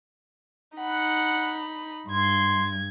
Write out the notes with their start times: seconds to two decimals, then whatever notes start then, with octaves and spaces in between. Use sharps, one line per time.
0.78 D#4 F#5 B5
2.07 G2 C6 G#6